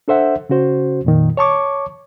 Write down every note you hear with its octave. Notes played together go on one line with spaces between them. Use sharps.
D4 A4 C5 E5 F#5
C#3 C#4 F#4 C5
F2 A#2 D#3
C#5 A5 C#6 D6